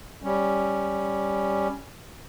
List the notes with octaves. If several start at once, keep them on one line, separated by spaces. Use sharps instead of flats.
G3 C#4